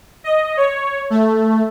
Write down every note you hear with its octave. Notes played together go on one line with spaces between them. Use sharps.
D#5
C#5
A3